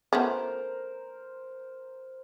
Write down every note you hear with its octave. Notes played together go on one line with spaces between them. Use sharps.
A3 B3 C#4 A#4 C5